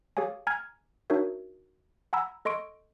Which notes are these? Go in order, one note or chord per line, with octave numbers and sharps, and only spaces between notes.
G4 G#4 C#5 F5 G#5
G#5 A#5 F6 G#6
D4 D#4 F#4 A#4 C#5 E5
F#5 G#5 A#5 B5 E6
A4 D#5 C6 C#6 D7